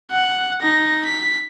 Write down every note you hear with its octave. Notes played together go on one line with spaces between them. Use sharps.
F#5
D#4 A#6
B6